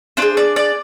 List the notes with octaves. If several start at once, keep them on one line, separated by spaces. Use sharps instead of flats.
D4 F4 G#4 C5
D5
D5